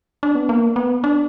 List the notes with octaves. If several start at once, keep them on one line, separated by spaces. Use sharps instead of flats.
D4
B3
A#3
B3
D4